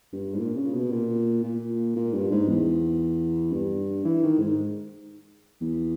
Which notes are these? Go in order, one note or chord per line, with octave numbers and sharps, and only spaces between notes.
G2
G#2
A#2
C#3
B2
A#2
A#2
A#2
G2
G#2
E2
G2
E3
D#3
G#2
E2